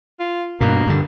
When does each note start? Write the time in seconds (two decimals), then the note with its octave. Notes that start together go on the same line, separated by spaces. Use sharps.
0.20 F4
0.61 G2 B2 A#3
0.87 G2 D3